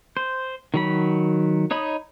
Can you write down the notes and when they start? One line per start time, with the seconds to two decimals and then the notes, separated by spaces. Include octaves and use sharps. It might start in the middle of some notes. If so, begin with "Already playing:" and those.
0.17 C5
0.74 D#3 F#3 B5
1.71 D#4 C#5 D#5 B5